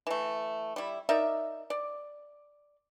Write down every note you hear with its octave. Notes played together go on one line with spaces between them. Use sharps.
E3 A3
G3 E4
D#4 A#4 D5 E5
D5